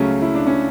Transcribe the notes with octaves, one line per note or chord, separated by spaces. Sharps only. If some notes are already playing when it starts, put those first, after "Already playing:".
Already playing: C#2 C#3 F#3 A3 C#4
E4
D4
C#4